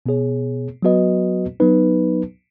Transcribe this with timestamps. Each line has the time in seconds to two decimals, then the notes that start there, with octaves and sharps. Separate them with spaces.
0.06 B2 B3 G#4 C#5
0.82 F#3 B3 F#4 B4 D#5
1.60 F#3 B3 D#4 B4